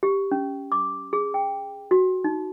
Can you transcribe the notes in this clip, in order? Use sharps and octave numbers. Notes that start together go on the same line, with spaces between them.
G4
C#4
D6
G#4
G5
F#4
D#4